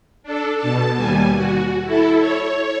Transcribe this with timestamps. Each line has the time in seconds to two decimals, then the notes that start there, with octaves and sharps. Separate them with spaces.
0.23 D4 A4
0.58 B2 A5
0.96 D#2 G3 G#5
1.35 F#4
1.84 E4 A4
2.20 C#5